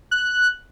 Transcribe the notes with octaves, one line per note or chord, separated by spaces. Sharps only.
F#6